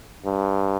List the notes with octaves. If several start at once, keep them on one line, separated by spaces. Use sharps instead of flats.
G2